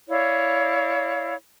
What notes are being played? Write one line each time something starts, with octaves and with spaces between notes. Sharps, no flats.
E4 C#5 D5 F5